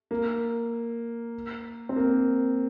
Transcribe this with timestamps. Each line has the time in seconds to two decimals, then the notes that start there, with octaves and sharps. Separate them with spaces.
0.11 A#3
1.89 C4
1.96 A#3